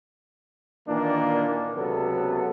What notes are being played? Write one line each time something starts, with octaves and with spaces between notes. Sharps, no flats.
A#2 D#3 E3 A#3 D4
C#2 C3 F#3 B3 A4